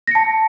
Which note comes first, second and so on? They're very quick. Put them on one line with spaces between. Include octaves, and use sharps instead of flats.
A#6 C#7 A5